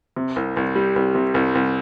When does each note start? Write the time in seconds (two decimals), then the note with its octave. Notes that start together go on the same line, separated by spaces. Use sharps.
0.16 C3
0.36 C2
0.57 C2
0.75 G3
0.96 C2
1.15 C3
1.34 C2
1.55 C2